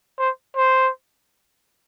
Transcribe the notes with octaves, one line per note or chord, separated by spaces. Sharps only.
C5
C5